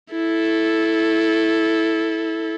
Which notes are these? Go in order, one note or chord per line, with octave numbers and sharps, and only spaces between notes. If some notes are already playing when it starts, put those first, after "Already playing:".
E4 A4